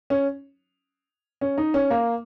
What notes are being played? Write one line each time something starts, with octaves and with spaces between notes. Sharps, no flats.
C#4
C#4
D#4
C#4
A#3